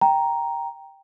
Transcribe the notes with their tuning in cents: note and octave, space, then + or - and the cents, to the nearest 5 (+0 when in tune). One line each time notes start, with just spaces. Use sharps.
G5 +0 A#5 +0